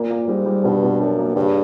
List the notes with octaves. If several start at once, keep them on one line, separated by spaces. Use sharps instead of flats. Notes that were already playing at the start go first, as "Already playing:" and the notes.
Already playing: A#2 A#3
A#3
G#2 G3
G3
G2 B2
B2
F#2 D4
A#3
G2 C#3